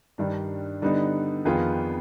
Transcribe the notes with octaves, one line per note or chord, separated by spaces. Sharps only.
G2 D#3 G3 D4
D3 G3 B3 D#4
F2 D#3 B3 F4 G#4